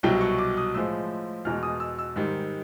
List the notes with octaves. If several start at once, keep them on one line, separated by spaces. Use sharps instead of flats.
C2 B2 F#3 G5
C#6
D6
D#6
A2 F3 G#3 E6
E2 B2 G#3 F6
D#6
E6
E6
G#2 D#3 G3